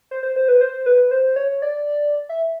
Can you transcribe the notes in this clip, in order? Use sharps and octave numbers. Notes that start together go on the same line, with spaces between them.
C5
C5
C5
B4
C5
B4
C5
C#5
D5
E5